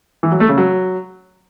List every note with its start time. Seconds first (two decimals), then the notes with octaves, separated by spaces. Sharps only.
0.23 E3
0.32 F#3
0.40 A3
0.49 C#3
0.58 F#3